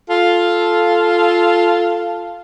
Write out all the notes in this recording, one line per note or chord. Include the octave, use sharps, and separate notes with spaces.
F4 A4